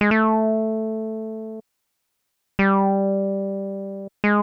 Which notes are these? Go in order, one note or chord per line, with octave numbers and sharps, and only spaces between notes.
G#3
A3
G3
G#3